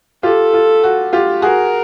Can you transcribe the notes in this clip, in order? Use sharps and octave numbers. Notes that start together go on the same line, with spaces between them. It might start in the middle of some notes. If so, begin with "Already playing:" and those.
F4 G4 A4
F4
F#4
F4 G4
F#4 G#4 A#4